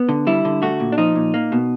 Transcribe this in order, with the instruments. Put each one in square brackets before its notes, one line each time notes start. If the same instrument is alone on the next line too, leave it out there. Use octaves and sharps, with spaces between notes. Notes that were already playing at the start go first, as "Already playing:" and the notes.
Already playing: [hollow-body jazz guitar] B3
D3
G3 E4
D3
A3 F#4
A#2
D4
F3 D#4
A#2
A#3
B2